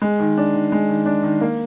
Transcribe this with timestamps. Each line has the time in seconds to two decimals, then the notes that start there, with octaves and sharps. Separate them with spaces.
0.02 G#3
0.20 D#3
0.37 D4
0.54 D#3
0.72 G#3
0.89 D#3
1.06 D4
1.23 D#3
1.41 A#3